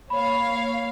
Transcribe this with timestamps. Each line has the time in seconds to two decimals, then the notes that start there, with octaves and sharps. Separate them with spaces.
0.10 A#3 C#5 F5 B5